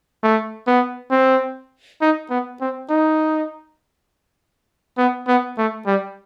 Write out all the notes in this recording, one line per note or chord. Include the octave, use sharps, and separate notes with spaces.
A3
B3
C4
D#4
B3
C4
D#4
B3
B3
A3
G3